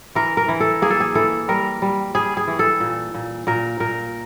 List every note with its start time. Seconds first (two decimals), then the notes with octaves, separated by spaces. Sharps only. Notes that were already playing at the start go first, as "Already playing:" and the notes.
0.15 E3 A#4
0.37 A#4
0.48 E3
0.60 A4
0.82 A#3 G#4
0.90 A4
1.00 G#4
1.15 E3 A4
1.48 G3 A#4
1.82 G3
2.15 G3 G#4
2.37 G#4
2.48 E3
2.59 A4
2.80 A#2
3.15 A#2
3.47 A#2 A#4
3.80 A#2 A#4